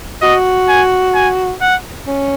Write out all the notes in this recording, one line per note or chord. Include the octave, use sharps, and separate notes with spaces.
F#4 D#5
G#5
G#5
F#5
C#4